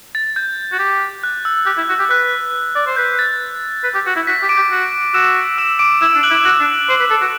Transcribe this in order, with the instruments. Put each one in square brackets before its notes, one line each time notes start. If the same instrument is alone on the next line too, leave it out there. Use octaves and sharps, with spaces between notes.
[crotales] A6
G6
[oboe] F#4
G4
[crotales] F#6
E6
[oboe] G4 [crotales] F#6
[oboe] E4
F#4
G4
[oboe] B4 [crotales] F#6
[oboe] D5
C5
[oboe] B4 [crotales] G6
[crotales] A6
[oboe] B4
G4
F#4
E4
[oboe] F#4 [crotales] B6
[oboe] G4
[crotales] D6 D7
[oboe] G4
F#4
[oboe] F#4 [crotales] E6 E7
[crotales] E6 E7
D6 D7
[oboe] E4 [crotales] E6 E7
[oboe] D4
[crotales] F#6 F#7
[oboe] E4
[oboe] F#4 [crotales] F#6 F#7
[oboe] D4
C5
B4
A4
F#4